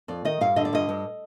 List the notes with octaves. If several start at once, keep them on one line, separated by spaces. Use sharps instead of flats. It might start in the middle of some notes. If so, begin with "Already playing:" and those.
F2 D5
D#3 D#5
G2 F5
D3 D#5
D5
G2 D#5
G2